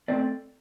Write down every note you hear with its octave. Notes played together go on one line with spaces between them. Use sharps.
A3 C4 D5